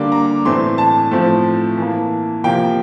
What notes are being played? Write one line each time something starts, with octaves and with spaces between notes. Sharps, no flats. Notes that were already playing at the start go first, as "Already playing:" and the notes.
Already playing: D3 G3 A#3 D6
A#5
A2 E3 A3 C4 C6
A5
A2 F3 A3 C4
E3 A#3
C3 F3 A#3 G5